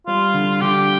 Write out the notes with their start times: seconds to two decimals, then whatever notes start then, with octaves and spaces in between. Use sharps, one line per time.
0.07 G3 F4
0.34 D3
0.61 D3 G4